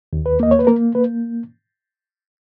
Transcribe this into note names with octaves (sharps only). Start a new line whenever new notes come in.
D#2
B4
A#3 D#5
C#5
B4
A#3 A#4
A#3 B4